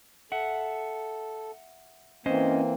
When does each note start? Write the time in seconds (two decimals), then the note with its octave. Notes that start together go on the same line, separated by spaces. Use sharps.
0.32 A4 E5 F#5
2.26 E3 A#3 C4 C#4 C5 D#5